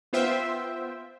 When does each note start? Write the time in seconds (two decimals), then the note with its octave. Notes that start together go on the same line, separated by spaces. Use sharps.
0.13 B3 F4 C5 E5 G5